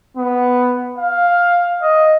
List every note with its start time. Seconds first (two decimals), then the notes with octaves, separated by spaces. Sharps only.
0.17 B3
0.98 F5
1.82 D#5